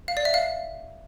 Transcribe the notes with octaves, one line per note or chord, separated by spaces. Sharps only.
F5
D5
E5
F5